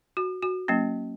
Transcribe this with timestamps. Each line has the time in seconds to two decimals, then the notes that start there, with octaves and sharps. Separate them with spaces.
0.17 F#4
0.42 F#4
0.68 F#3 A#3 C#4